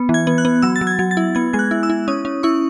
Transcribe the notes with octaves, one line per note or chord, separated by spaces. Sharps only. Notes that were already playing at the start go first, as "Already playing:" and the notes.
Already playing: B3
E3
G#6
B3
F#6
B3
F#3 E6
A6
F#3
G#6
F#3 G#6
A6
E4
B3 G#6
G#3 G#6
F#6
E4
E6
E4
C#4 D#6
C#4
E4 C#6